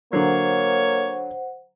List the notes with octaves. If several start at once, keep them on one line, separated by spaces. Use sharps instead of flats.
D3 F#3 A#3 C5 C#5 F#5